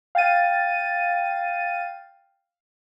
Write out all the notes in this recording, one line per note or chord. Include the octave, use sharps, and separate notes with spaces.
F5 G5 A6 D#7